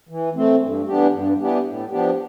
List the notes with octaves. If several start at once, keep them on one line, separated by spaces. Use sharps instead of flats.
E3
A3 C4
G2
E3 B3 D4 G4
G2
E3 B3 D4 G4
A2
F3 B3 D4 G4